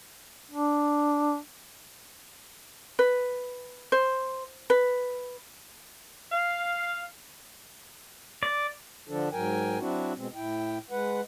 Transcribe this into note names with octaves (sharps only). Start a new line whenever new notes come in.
D4
B4
C5
B4
F5
D5
D3 F3 D4 A4
G#2 F#3 A#4 G5 G#5
F#3 C4 D4 E4 F#4
B2 G#3 C4
A2 E4 G5
G#3 B4 F#5